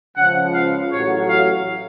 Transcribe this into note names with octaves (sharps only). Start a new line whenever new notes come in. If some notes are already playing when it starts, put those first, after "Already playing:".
C#2 C#3 F3 F#5
F5
A1 A2 F#3 C#5
F5